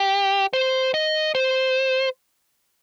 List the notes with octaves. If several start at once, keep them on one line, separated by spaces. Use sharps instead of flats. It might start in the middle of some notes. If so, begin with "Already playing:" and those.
Already playing: G4
C5
D#5
C5